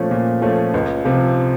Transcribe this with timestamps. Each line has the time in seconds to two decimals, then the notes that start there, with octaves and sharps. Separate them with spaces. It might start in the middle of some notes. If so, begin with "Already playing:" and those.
Already playing: A#2 F3 A3 C#4
0.11 A#2
0.42 F3 A3 C#4
0.74 C#2
1.05 C3 F3